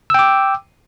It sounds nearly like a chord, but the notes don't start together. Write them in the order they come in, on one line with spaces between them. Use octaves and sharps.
E6 G5 D6